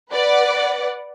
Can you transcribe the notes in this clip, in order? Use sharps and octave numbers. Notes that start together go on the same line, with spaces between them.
B4 D5 F#5